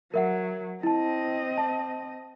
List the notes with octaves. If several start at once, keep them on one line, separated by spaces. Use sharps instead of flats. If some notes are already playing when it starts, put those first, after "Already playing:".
F#3 A#4 E5 F#5
C4 E4 D#5 A5
A5